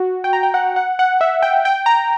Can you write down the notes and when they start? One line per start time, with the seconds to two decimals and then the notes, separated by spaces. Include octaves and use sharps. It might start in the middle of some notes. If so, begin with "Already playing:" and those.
Already playing: F#4
0.24 G5
0.33 A#5
0.43 G5
0.54 F#5
0.76 F#5
0.99 F#5
1.21 E5
1.42 G5
1.65 G5
1.86 A#5